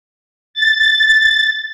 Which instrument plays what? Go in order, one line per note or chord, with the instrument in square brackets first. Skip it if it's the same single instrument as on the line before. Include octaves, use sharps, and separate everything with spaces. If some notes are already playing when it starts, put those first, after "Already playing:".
[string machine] A6